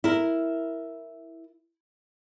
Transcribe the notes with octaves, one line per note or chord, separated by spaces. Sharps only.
E4 A#4